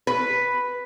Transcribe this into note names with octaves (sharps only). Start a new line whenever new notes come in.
B4